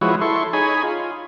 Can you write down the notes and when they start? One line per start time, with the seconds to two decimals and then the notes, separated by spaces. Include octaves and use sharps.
0.01 F3 G#3 E4 F#4 B4 C#5
0.21 E4 A4 C6 C#6
0.53 D#4 G#4 C#5 G#5 B5
0.84 F4